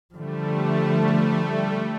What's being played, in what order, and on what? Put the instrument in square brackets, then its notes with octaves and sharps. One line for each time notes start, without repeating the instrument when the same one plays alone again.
[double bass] D3 F3 [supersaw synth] G3 A3